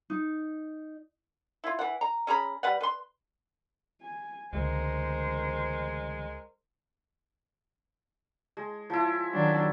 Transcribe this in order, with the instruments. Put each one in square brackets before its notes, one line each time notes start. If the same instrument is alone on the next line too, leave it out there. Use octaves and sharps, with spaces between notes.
[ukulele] D#4
[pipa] E4 F4
E3 F#5
A#5
C#4 G#4 A#5 B5
G3 B4 F#5
B4 C6
[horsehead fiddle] G#5
[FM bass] C#2 [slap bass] D3 E3 A3 [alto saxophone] G#3 [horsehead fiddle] A#4 C5
[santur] G#3
F3 E4
[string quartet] D#3 F#3 D4